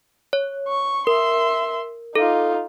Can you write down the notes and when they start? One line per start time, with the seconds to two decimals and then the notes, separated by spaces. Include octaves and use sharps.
0.33 C#5
0.68 C#6
1.07 A#4 E5 C6
2.15 D#4 F4 A4